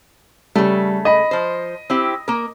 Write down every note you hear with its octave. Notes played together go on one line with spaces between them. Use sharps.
C#3 G3 A3
D#5 B5
F3 C5
C4 E4 G4
A#3 A#4